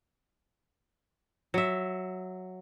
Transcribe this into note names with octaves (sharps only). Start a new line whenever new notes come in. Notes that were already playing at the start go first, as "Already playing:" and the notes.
F#3 E5